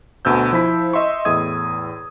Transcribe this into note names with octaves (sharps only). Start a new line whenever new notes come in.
D2 B2 E6 G6
F3 E4 B6
D#5 E5 C6 C#6
E2 A2 D#6 G#6